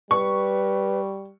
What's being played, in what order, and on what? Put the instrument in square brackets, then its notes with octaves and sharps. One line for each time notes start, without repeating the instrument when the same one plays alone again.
[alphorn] G3 [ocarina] B4 [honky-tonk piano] C#6